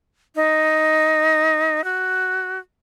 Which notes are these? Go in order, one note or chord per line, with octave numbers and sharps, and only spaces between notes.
D#4
F#4